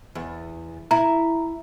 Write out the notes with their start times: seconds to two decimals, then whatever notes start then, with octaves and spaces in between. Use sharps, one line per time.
0.15 E2
0.91 E4 A#5